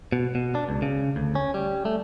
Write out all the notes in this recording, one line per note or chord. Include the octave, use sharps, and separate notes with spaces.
B2
B2
D4
C#2
C#3
D2
C#4
G3
A3